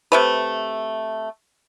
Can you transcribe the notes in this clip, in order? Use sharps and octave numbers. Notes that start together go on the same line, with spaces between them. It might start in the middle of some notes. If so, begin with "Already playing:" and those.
C3 A3 B4